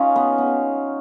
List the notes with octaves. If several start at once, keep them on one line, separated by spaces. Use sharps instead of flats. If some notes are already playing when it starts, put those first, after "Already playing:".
Already playing: C#4 D#4 F4
B3
B3